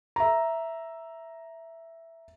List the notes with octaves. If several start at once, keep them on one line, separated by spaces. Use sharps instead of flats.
E5 A#5